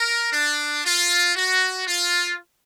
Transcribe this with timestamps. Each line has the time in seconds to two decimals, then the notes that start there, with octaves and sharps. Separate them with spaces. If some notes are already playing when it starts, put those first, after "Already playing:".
Already playing: A#4
0.33 D4
0.85 F4
1.35 F#4
1.87 F4